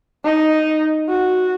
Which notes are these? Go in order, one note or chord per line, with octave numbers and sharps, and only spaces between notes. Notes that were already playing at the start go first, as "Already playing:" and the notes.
D#4
F#4